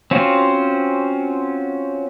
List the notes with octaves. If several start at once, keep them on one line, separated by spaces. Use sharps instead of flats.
C4 C#4 F4 F#4 C5